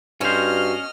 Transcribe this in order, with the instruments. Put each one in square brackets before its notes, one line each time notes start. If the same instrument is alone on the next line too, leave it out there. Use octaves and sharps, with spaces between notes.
[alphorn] G2 [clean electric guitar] C#4 C5 [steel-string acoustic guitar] F#4 [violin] D#5 F6